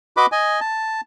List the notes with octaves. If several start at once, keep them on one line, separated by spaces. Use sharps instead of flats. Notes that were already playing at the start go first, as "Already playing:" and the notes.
F#4 B4 D#5 B5 D6
D#5 G#5
A5